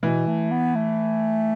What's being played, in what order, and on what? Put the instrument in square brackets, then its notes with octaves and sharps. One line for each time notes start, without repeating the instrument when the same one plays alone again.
[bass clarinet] B2 [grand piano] E3
[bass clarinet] A3
B3
A3